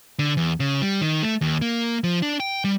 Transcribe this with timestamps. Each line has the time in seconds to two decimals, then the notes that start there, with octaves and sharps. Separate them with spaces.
0.19 D3
0.37 E2
0.60 C#3
0.82 G3
1.01 D#3
1.23 A3
1.41 D#2
1.61 A#3
2.04 F3
2.22 D4
2.40 G5
2.64 G3